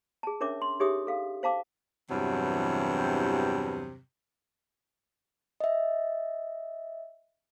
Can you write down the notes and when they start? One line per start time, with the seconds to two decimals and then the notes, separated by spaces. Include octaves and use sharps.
0.23 G#4 A5
0.40 C#4 D4 A#4 C#5 E5 D6
0.62 C6
0.80 D#4 G4 G#4 C#5 E5 D#6
1.07 A4 F5
1.43 C5 F5 A5 D6
2.10 E2 G2 C3 E3 F#3
5.60 D#5 E5